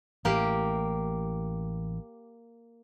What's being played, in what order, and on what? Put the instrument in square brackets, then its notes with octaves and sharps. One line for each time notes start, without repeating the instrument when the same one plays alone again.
[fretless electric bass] A1 A2 [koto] A#3 G4